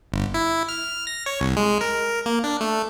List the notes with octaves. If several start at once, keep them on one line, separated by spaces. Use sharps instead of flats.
G1
E4
F6
A#6
C#5
C2
G#3
A#4
A#3
D4
A3